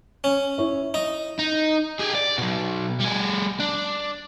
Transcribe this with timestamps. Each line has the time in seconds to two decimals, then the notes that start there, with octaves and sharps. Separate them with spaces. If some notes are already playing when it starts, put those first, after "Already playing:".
0.24 C#4
0.58 E4 C#5 E5
0.94 D#4
1.39 D#4
1.99 G4 G#4
2.15 D5
2.38 B2 F#3
3.00 G3 G#4
3.60 D4